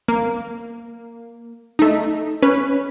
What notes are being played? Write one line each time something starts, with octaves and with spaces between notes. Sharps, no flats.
A#3
A3 D#4
C#4 B4